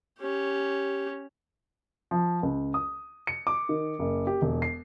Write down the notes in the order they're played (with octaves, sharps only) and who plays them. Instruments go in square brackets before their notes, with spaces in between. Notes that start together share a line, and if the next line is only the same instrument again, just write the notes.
[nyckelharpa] C#4 G4
[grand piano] F3
C#2
D#6
C#7
D6
D#3
F#1
G4
E1
C7